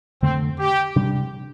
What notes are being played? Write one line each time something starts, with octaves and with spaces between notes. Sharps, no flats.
F2 D3 A3 C4
G4
C3 G3 D4